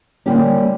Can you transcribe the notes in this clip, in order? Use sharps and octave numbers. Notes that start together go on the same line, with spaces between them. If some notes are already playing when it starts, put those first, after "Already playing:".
D3 G3 A#3 C#4 G4